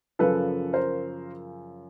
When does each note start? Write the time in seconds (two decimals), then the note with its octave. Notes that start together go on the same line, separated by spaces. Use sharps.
0.19 F#2 C#3 F3 A4 B4
0.73 A#4 C5